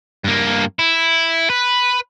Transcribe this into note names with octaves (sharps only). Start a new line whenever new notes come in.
G2 A#3
E4
B4